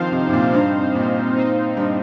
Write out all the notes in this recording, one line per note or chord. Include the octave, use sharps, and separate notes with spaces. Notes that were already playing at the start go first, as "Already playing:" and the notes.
Already playing: D#3 F3 C4 D#4 C5 F5
C3
C3
A#2
G2
A#2
C4 D#4 C5 F5
G2